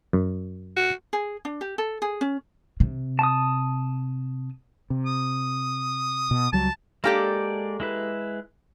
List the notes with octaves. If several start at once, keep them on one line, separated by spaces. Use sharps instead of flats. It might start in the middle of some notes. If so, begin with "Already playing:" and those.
F#2
F#4
G#4
D4
G4
A4
G#4
C#4
C3
A5 D#6
C3
D#6
B2
C#2 F#3 G3 A5
G#3 A#3 G4 A4 D5
G#3 E4 B4